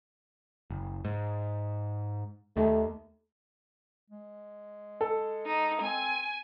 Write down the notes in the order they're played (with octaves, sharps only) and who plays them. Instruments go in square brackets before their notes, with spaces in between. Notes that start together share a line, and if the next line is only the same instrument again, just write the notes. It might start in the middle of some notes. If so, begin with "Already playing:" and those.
[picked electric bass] F#1
G#2
[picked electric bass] D#2 D#3 [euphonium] A3
[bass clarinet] G#3
[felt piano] A4
[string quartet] D#4
[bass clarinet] C4 [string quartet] G#5